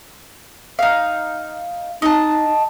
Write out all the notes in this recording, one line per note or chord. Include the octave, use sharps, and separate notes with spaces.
D#4 F5
D#4 D#5 A5